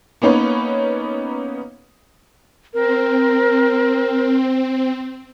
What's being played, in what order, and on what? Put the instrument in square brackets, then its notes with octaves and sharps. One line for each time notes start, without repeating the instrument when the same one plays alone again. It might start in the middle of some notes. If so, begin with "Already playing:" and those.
[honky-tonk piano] A#3 B3 C#4 D#4 B4 C#5
[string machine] C4 [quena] A#4